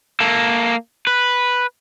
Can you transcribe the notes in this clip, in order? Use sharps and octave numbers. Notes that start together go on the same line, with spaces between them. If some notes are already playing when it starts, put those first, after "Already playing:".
A#3 A4
B4